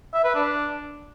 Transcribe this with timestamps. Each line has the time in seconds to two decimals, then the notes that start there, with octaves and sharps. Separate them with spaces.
0.14 E5
0.24 B4
0.35 D4